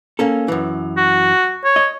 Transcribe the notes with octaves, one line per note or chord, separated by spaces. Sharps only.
A#3 C#4 A4
F#2 E3
F#4
C#5
D#5